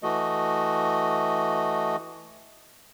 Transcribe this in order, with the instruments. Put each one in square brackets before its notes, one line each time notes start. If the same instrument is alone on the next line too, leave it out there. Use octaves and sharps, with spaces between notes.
[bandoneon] E3 A3 F#4 D#5